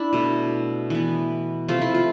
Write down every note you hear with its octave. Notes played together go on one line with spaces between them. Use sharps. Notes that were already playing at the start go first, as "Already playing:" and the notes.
Already playing: D4 E4
B2 A3
E3 B3
C3 F3 A3 F4
E4
F4